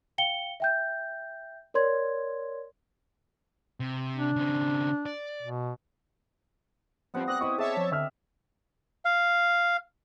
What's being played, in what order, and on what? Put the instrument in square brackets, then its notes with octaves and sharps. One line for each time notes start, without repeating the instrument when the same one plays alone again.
[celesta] F5 G5 C#7 G7
E5 G5 G6
A#4 C#5 D5 C6 G#6
[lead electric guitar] C3
[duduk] D4
[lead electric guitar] C#3 C4
D5
[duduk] B2
[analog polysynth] F3 G3 C4 [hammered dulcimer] B3 F#5 C6
[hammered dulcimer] C4 G4 D5 [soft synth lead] D#6 [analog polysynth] F#6 A#6
[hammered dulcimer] C4 D#5 E5 [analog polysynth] E4 [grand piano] C#6
[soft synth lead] G#4 [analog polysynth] C#5 E5 A5 [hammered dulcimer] D5
[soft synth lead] F3
[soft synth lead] D3 [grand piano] E5 E6 F6
[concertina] F5